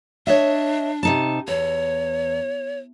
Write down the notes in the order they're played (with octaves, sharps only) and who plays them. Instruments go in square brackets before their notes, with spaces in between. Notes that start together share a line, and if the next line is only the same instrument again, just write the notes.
[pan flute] D4 [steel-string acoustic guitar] C#5 D#5 E5
[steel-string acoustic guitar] C3 D#4 A5
[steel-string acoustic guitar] E2 [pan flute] C#5